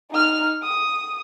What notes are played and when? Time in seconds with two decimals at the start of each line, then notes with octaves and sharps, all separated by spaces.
0.11 D#4 F6
0.62 D#6